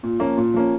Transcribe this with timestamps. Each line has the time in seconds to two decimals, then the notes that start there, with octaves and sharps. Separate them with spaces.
0.03 A#2
0.20 F3 A#3 C#4
0.37 A#2
0.54 F3 A#3 C#4